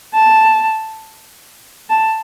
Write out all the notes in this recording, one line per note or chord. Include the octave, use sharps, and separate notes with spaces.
A5
A5